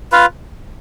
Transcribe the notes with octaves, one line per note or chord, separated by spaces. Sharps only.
F4 B4 F5